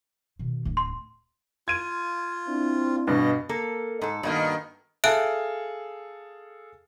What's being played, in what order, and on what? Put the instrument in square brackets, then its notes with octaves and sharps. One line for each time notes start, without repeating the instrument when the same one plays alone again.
[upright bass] B2 D#3
D1 D4
[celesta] C6
[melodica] F4 [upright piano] G#6 D#7
[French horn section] C4 D4 E4
[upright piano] G2 B2 [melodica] D#5
[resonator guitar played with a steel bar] A#3 A4
G#2 A4
[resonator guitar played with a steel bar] G2 A#3 B3 [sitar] B2 D#3
[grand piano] G#4 A4 F5 [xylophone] E5 F#6 D7